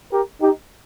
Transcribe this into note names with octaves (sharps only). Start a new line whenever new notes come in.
G4 A#4
D#4 G4